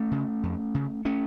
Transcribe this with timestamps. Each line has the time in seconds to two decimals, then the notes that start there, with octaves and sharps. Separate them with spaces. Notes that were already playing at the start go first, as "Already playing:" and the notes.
Already playing: A3 C#4
0.11 C#3
0.43 F2
0.75 C#3
1.05 A3 C#4